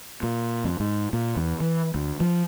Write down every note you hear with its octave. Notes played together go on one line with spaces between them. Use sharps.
A#2
F2
G#2
A#2
E2
E3
D2
F3